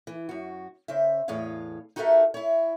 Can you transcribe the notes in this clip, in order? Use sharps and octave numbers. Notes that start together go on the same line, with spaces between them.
E3
F#2 F#4
C#3 C5 E5
E2 A2 G#4 C#5 F5
D#4 F#4 G4 A4 A#4 E5
E4 C#5